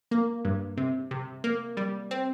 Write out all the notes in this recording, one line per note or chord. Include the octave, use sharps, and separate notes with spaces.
A#3
G2
C3
C3
A#3
G3
C4